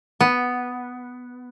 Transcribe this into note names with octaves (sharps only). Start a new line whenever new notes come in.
B3